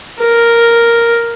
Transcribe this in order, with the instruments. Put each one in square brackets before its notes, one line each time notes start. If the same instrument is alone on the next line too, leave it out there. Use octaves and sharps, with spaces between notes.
[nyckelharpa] A#4